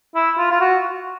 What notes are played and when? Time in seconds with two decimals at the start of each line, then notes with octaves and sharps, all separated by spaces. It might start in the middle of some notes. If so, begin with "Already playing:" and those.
0.15 E4
0.38 F4
0.51 F4
0.61 F#4